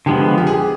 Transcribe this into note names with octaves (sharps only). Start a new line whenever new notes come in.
D3 F3 G#3 B3 G4
G4
G#4